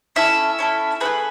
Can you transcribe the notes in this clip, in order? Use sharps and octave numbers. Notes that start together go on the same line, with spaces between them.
C#4 E4 A4 E5
C#4 E4 A4
A3 C#4 G#4 B4